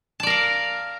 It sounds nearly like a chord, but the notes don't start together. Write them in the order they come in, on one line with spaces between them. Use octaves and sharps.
A5 D5 A#4 F5